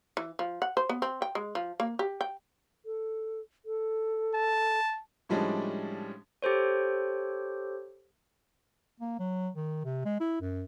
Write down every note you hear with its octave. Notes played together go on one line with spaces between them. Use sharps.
E3
F3
F#5
C5
B3
C4
G5
G#3
F3
A#3
G4
G5
A4
A4
A5
A2 F3 G3 G#3 C#4 D4
G4 A4 C5 C#5
A#3
F#3
D#3
C3
G#3
E4
F#2